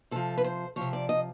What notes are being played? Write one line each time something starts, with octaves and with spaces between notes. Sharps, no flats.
C3 F3 A4
B4
C5
C3 F3 C#5
D5
D#5